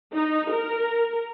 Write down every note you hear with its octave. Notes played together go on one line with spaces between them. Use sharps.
D#4
A#4